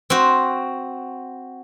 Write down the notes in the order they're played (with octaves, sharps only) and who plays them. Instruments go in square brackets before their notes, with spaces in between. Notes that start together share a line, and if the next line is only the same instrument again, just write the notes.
[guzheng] C4 F#4